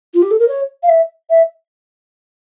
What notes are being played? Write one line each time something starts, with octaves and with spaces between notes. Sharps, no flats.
F4
G4
A4
A#4
C#5
F5
E5
E5